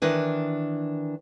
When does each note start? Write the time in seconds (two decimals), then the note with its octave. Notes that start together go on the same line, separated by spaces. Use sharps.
0.02 D#3 E3 D4 B4